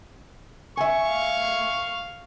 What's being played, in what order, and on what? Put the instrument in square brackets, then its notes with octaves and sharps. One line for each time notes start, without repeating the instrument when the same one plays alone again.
[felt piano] E5 G#5 [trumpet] C#6
[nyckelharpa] F5